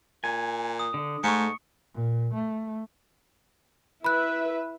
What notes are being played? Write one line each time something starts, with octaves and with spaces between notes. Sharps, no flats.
A#2 G#5
D#6
D3
G#2 A3 C#6 C#7
A#2
A3
E4 B4 E5 B5 F#6